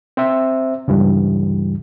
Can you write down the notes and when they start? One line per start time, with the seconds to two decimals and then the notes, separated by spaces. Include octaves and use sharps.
0.17 C4 C5 E5
0.88 C#2 G2 E3 G3